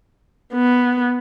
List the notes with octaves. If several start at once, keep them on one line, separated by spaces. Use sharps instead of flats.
B3